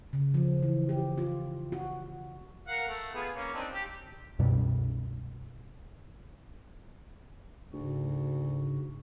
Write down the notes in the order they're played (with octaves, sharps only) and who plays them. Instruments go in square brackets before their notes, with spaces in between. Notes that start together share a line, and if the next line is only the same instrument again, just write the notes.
[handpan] C#3
F3
E3
G4
F4
F#4
[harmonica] A#4 F5 F#5
A3
B3 F4 G#4
A#3 C#4
C4 D4 D#4
G4
[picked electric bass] C2 F#2 B2 G3
[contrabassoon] D2 [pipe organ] G#2 C#3 F#4